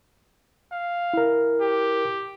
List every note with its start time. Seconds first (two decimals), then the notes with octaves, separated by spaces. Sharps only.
0.72 F5
1.13 E4 A#4
1.61 G4